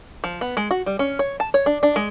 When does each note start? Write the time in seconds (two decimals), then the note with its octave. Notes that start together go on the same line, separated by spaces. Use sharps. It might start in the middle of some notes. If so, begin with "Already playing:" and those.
0.24 F3
0.41 B3
0.57 G#3
0.71 F#4
0.86 G3
0.99 C#4
1.19 C#5
1.40 A5
1.54 C#5
1.66 D4
1.83 D4
1.96 G#3